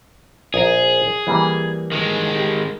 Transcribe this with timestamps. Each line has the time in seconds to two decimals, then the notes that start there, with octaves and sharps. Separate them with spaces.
0.54 A#1 G#4 A#4
1.27 E3 G3 A#3
1.92 D#3 G#3
2.35 G4